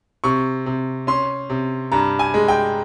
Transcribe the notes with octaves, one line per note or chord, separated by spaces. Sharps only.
C3 C#6
C3
C#4 C6
C3
G2 A#5
G#5
G#3
G5